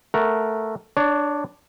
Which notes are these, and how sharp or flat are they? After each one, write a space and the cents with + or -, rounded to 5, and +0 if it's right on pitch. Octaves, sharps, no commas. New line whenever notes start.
A3 +0 A#4 +0 F#5 +0
D4 +5 C#5 +30